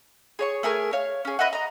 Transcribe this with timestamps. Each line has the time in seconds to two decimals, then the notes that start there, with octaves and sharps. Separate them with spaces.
0.39 G#4 C#5 C#6
0.63 A3 G#4 A#4 G#5
0.93 C#5 F5
1.25 C#4 G#4
1.39 B4 D#5 E5 F#5
1.53 D#5 A#5